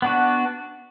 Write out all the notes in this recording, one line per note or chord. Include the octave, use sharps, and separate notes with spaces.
B3 D4 F#4